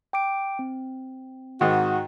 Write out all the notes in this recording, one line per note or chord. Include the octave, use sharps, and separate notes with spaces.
G5 D6 D7
C4
G#2 D#3 F#4